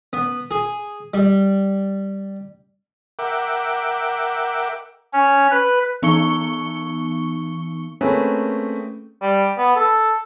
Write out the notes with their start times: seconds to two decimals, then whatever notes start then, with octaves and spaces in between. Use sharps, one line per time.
0.13 B3
0.51 G#4
1.14 G3
3.19 A#4 E5 F#5 G5 D6
5.13 C#4
5.51 B4
6.02 E3 B3 D#4 C#6 C#7 G7
8.01 A3 A#3 C4 C#4 G#4 B4
9.22 G3
9.58 B3
9.76 A4